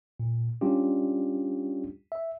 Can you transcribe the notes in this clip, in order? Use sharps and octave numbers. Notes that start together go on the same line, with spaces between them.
A#2
G3 C#4 D4 F4 G4
E5